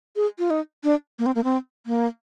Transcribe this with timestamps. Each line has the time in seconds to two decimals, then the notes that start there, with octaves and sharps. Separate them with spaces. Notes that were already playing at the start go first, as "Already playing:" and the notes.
0.16 G#4
0.39 F4
0.50 D#4
0.84 D4
1.19 A#3
1.26 C4
1.35 A#3
1.44 C4
1.86 A#3